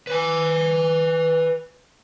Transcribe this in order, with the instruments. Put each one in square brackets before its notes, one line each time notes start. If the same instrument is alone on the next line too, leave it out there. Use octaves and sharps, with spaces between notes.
[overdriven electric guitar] B4 G#5